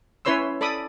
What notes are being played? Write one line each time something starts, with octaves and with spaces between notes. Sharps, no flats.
C#4 E4 B4 C#5 C6 E6
A4 D5 B5 D6 D#6